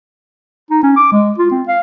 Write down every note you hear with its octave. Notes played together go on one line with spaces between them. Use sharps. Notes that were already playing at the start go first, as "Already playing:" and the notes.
D#4
C#4
D6
G#3
F4
C4
F5